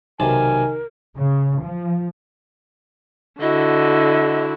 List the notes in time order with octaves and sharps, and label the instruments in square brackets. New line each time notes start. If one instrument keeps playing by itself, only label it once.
[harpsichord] B1 C3 A5 [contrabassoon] D#3 [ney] A#4 [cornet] G#5
[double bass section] C#3
F3
[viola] D3 [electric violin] E4 F#4 [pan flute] D#5